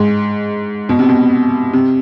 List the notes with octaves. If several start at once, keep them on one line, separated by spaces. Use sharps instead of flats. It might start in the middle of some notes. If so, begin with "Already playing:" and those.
Already playing: G#2
B2
C3
B2
C3